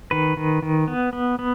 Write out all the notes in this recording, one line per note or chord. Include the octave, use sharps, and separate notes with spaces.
D#3 B4
D#3
D#3
B3
B3
B3